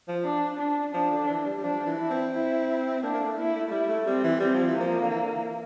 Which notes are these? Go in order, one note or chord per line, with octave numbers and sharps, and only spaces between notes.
F3
D4
D4
F3 D4
D3
E3
G3
G3
F3 D4
F3
E3
E4
C4
E4
A#3 D4
A#3
A3
A#3 E4
A3
A3
G3 E4
A3
G3 C4
E3
G3 C4
F3
E3
A#3
F3
D3
E3
D3
E3